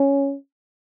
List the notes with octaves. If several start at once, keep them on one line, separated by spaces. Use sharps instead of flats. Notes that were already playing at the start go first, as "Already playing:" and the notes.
Already playing: C#4